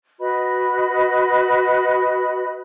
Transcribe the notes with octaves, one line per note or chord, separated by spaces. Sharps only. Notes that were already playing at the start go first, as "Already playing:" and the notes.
F#4 B4 D#5 B5